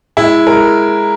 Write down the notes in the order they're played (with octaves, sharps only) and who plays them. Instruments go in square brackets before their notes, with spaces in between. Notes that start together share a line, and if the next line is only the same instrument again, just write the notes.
[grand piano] G#3 [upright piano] E4
[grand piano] G#3 [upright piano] A#4